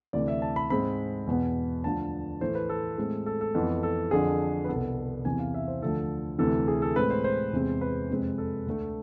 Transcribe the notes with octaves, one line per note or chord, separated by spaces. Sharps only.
D2 C3 E3 D5
E5
A5
B5
G#2 G#3 C4 B5
E2 B2 B3
D2 D3 F3 A5
A2 E3 A3 C5
B4
A4
A2 G#3 C4
A4
A4
F2 E3 B3
A4
F2 D3 F3 G#4
B4
C2 B2 B3 A4
E2 C3 E3 G#5
F5
E5
C5
D2 D3 F3 A4
D2 C3 E3 A4
G#4
A4
A2 G#3 C4 B4
C5
C5
E2 C3 G#3 C4
B4
F2 C3 G#3 C4
A4
D2 D3 A3